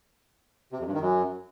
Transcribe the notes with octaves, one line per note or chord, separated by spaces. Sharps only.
C3
F2
G2
D#3
F#2